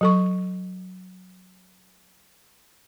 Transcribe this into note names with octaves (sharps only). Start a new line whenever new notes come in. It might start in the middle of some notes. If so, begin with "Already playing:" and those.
F#3 A4 C#6